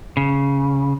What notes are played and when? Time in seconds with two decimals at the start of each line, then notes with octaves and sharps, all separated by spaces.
0.17 C#3